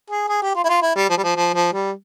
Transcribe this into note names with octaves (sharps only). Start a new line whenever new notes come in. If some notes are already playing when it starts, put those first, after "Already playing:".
G#4
G#4
G4
F4
E4
F4
E4
G3
F3
G3
F3
F3
F3
G3